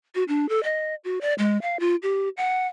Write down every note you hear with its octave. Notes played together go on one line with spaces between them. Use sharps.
F#4
D4
A4
D#5
F#4
D5
G#3
F5
F4
G4
F#5